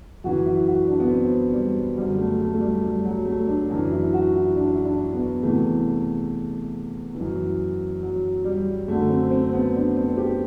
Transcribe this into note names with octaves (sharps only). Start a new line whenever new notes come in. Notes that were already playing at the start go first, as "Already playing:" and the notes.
F#2 E3 F#4
E4
F#4
D4
B3
C4
G3
F#2 D3 G3
A3
A3
A3
G3
G3
F#3
A3
D4
F#2 E3 D4
E4
F#4
E4
D4
E4
D4
B3
E2 C3 E3 A3
E3
F#2
F#3
G3
F#2 D3 A3
C4
C4
B3
D4
C4
G4